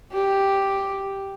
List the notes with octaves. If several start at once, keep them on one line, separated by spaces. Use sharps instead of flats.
G4